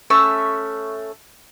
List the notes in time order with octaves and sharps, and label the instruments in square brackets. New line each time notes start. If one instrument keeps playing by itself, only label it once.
[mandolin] A3 C#4 E5 C#6